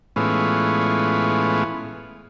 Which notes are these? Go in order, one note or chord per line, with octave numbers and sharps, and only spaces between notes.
A2 E3 G#3 B3 C#4 F4